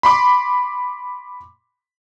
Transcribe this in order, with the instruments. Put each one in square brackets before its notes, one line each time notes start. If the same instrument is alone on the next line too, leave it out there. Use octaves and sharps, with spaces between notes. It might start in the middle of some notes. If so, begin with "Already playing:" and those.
[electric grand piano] B5 C6 D6